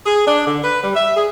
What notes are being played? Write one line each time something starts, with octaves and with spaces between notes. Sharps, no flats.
G#4
D4
D3
B4
G3
E5
G#4